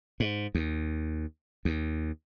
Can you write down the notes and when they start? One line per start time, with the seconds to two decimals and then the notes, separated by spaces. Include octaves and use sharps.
0.20 G#2
0.55 D#2
1.65 D#2